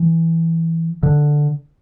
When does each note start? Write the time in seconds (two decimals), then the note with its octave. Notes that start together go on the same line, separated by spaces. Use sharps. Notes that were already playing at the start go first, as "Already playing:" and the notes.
Already playing: E3
1.03 D3